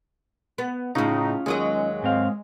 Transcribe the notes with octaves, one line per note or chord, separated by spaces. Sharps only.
B3
A2 C#3 C#4 D#4 F4
D#2 F#3 G#3 D#5
G#2 C4 F5